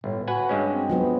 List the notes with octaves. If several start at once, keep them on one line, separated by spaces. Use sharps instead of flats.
G1 A2
F#4 B4 F#5 G#5
G2 G#3 C#4
C4
F3 F#3 B3